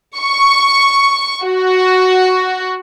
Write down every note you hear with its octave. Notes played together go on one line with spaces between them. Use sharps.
C#6
F#4